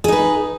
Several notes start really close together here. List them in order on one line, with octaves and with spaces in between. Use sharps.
G#4 D#4 B4